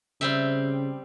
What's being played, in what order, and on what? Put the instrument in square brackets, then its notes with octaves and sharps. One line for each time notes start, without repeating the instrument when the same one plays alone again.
[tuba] C#3 [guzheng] G3 C4 E5